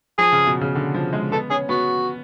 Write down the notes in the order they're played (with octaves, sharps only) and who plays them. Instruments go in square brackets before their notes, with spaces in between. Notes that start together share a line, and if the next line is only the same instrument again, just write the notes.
[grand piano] F3 [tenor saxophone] G#4
[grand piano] C#3
B2
C#3
D3
F3
G#3
[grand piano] B3 [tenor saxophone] A4
[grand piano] C#4 [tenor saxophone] G#4
[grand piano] B3 [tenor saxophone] F#4